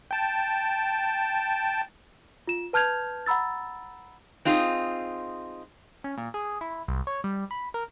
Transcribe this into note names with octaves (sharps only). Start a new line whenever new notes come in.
G5 A5
F4 E7
B4 A5 F6 G6 G#6 F7
F#5 A#5 B5 E6 A6
C4 D#4 F4 G#4
C#4
A#2
G#4
E4
C2
C#5
G3
B5
A#4